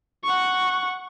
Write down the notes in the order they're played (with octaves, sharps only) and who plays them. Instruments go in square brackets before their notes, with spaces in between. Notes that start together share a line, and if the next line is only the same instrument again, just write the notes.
[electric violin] F#5 C#6